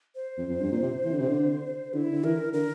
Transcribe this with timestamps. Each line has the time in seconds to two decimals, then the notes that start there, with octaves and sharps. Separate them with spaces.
0.15 C5
0.38 F2
0.50 F2
0.60 G2
0.72 A#2
0.82 C3
1.04 E3
1.12 D3
1.20 C3
1.28 D3
1.94 D3 E4
2.12 D3
2.23 E3 A#4
2.53 D3 A#4